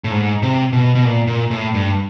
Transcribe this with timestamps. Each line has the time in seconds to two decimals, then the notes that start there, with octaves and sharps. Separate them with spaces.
0.04 A2
0.11 G#2
0.43 C3
0.73 B2
0.95 B2
1.05 A#2
1.27 A#2
1.51 A2
1.74 G2